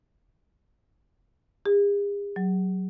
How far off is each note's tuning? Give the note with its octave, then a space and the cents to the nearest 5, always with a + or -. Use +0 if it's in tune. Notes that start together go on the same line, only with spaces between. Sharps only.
G#4 -45
F#3 +15